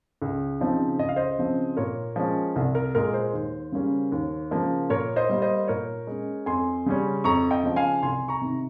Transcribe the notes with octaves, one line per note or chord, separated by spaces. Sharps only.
C#2
C#3 F3 C4 D#4
C#2 D#5
F5
C5 D#5
C#3 F3 C4
A#2 A#4 C#5
F3 G#3 C#4
C2
A#4
A#2 G#3 A#4
C5
D#2
C#3 G3 A#3 C#4
D#2
C#3 F3 A#3
A#2 A#4 C#5
C5 D#5
G3 A#3
C5 D#5
A#2 A#4 C#5
G#3 C#4
F2 G#5 C6
C#3 G3 C#4
F2 A#5 C#6
D#5 G5
C#3 F3
F5 G#5
C2 G#5 C6
A#5 C#6
C3 D#3